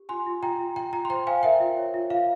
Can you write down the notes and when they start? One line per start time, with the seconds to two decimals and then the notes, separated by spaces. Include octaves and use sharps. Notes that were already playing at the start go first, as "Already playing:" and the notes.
Already playing: G4
0.09 F4 G#5 C6
0.26 F4
0.42 F4 G5 A#5
0.59 F4
0.76 F4 G5 A#5
0.93 F4 G5 A#5
1.05 C6
1.10 C5 G5 A#5
1.27 C5 F5 G#5
1.43 A#4 E5 G5
1.60 F4
1.77 C#5
1.94 F4
2.10 F4 F5